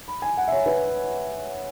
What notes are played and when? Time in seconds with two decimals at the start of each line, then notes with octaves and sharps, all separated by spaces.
0.08 B5
0.22 G#5
0.37 F#5
0.48 E5
0.52 C#5
0.66 B4